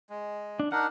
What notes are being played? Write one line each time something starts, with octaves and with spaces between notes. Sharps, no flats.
G#3
D4
D4 D#4 A#4 F#5